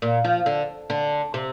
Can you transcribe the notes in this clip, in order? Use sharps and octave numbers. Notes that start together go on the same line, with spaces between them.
A#2
F3
D3
D3
C3